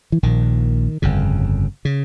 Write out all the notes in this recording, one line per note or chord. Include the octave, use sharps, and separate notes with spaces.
E3
A#1 A#2 D#3
G1 F2 C#3
C#3